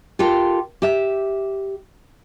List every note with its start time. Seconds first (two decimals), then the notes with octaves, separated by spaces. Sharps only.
0.19 F4 G4 A4 A#4 G5
0.82 G4 E5